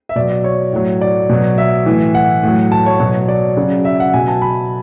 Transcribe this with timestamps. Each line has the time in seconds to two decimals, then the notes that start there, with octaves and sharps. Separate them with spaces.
0.09 E5
0.16 B2 F#3 D5
0.44 C#5
0.73 A2 F#3
1.01 D5
1.29 B2 F#3
1.58 E5
1.86 A2 E3
2.15 F#5
2.43 A2 F#3
2.72 A5
2.86 C#5
3.00 B2 F#3 C#5
3.28 D5
3.57 C#3 F#3
3.85 E5
4.00 F#5
4.14 B2 F#3 G#5
4.28 A5
4.42 B5